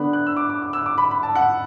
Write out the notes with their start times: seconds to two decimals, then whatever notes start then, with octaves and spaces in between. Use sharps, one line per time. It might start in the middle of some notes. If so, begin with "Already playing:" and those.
Already playing: D3 B3 D4 F#6
0.13 F#6
0.27 E6
0.37 D6
0.50 D6
0.62 D6
0.73 E6
0.86 D6
0.98 B5
1.11 B5
1.23 A5
1.35 F#5